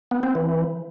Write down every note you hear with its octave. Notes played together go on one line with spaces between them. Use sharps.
B3
C4
E3